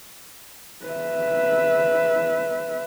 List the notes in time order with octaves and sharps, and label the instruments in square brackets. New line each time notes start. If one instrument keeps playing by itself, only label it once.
[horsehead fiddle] B4 E5